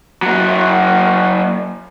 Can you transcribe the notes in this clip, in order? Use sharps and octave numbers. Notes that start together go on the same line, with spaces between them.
F#3 A#3